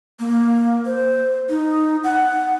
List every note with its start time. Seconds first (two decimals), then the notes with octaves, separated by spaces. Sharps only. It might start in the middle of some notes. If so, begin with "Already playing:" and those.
0.20 A#3
0.86 C5
1.50 D#4
2.04 F#5